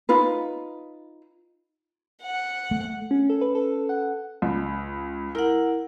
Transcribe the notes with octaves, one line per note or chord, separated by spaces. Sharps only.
D#4 F4 B4
F#5
A3
C#4
A4
B4
A4
F#5
C#2
E4 A#4 F#5